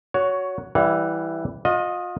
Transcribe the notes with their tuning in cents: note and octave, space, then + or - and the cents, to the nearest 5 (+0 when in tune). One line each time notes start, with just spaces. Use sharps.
F#4 +0 C#5 +15
E3 +0 G3 +0 F#5 -40
F4 +35 D#5 +0